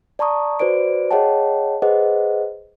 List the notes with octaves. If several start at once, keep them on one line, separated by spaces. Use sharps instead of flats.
D5 A5 A#5 C#6 D#6
F#4 B4 C5 D5 D7
G#4 C#5 D#5 F#5 G5 A5
G#4 B4 C5 D#5 F#5